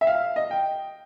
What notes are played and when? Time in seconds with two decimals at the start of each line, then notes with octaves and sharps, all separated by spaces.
0.01 E5
0.07 F5
0.36 D#5
0.51 G5